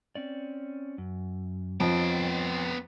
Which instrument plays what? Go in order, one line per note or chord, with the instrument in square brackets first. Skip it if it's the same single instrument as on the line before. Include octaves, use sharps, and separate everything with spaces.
[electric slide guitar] C4 C#4 D5
F#2
[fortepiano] F2 [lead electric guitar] B3 G5 [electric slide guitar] C#5 D#5 A5